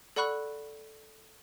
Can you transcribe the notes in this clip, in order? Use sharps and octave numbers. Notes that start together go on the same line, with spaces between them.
A4 D5 F#5 B5 C#6 F#6